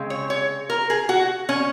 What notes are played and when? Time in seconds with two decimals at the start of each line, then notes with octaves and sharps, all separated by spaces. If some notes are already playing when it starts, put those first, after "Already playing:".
Already playing: C#3 G#3 C4
0.10 C#5
0.30 C#5
0.70 A#4
0.90 G#4
1.09 F#4
1.49 C#4